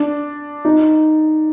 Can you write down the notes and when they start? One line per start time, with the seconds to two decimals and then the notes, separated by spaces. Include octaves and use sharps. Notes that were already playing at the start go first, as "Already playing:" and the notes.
Already playing: D4
0.65 D#4